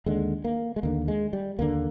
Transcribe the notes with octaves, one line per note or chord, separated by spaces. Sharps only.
D#2 D3 G#3
A#3
G#3
D#2 D3 A#3
G#3
G3
D#2 D3 A#3